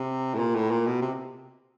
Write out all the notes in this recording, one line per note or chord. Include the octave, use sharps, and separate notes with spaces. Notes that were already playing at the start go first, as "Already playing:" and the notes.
Already playing: C3
A2
A#2
A2
A#2
B2
C3